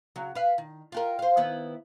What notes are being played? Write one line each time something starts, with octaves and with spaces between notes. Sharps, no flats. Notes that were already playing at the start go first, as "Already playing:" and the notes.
C#3 F#3
B4 F5
D#3
F4 G4 A#4
C5 F5
D#3 B3 E4